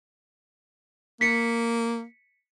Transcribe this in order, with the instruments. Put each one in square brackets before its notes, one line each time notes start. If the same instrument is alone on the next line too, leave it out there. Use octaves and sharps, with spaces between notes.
[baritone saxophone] A#3 [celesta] B6 C#7